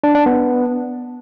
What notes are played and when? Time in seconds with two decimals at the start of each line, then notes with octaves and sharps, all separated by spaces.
0.04 D4
0.15 D4
0.26 B3